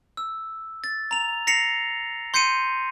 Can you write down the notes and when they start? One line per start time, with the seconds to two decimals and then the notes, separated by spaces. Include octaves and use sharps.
0.17 E6
0.84 A6
1.11 A#5 F7
1.47 A#6 C7 C#7 F7
2.34 C6 G6 C7 C#7 D#7